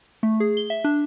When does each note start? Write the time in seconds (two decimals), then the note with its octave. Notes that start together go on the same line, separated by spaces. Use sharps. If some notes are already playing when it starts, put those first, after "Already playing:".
0.23 A3
0.40 G#4
0.57 G7
0.70 E5
0.84 D4